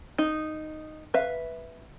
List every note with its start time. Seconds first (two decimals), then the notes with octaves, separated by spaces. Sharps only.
0.18 D#4
1.14 B4 E5 F5